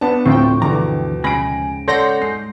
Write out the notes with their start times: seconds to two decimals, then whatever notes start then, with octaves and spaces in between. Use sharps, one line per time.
0.01 B3 D4 A5
0.25 D2 A2 F3 C4 G5 C#6
0.62 G2 B2 D3 E3 A#5 D6
1.24 G#2 C#3 G#5 B5 A#6 D7
1.88 A4 C#5 D5 F#5 C6 G6 A#6
2.22 G#2 C7